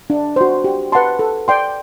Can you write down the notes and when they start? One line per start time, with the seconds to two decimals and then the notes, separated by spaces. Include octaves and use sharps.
0.10 D4
0.36 F#4 C5
0.64 G4
0.92 B4 F#5 A5 C6
1.19 A4
1.48 D5 G5 C6